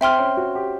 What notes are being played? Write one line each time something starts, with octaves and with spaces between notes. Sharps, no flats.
C4 E5 G5 C6 F6
C#4
F#4
G4